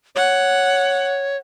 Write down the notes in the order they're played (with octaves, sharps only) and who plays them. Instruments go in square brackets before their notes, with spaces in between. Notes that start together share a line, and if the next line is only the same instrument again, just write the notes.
[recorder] C#5 [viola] F#5